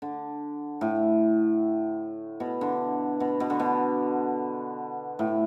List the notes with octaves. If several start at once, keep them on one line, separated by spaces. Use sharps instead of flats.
D3
A2
B2
D3
B2
B2
D3
B2
A2